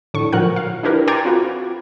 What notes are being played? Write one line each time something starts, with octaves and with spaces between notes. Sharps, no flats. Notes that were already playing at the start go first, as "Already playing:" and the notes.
A2 D3 C#6
A#2 F3 F#3 A#4 F#5 F#6
F5
D4 E4 G4 A#4 B4
G5 A#5 C6 D6 G#6 A6
C4 F4 F#4 B4